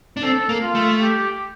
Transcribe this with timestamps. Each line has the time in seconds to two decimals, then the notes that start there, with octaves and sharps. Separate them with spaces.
0.17 D4
0.23 C4 A4
0.49 A#3
0.62 F4
0.75 A3
1.01 G4